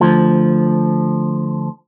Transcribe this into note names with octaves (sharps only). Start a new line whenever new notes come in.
D2 F3